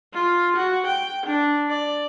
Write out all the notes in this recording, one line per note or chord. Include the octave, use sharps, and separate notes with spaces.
F4
F#4
G5
D4
D5